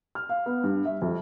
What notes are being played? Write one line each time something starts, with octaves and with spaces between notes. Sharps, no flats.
F6
F5
B3
G2
E5
F2